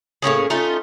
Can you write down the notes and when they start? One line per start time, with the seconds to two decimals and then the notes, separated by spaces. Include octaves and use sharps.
0.22 A2 A#3 C#4 G#4
0.50 A3 C#4 D#4 F4